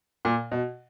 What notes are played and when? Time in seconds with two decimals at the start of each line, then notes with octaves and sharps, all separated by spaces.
0.25 A#2
0.52 B2